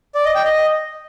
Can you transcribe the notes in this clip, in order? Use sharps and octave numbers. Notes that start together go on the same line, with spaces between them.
D5
D#5
G5
D#5